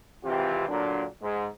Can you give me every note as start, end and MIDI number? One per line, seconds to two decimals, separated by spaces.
0.24 0.66 32
0.24 0.66 48
0.24 0.66 52
0.24 0.66 60
0.24 0.66 65
0.24 0.66 67
0.68 1.05 46
0.68 1.05 50
0.68 1.05 54
0.68 1.05 58
0.68 1.05 62
1.21 1.46 44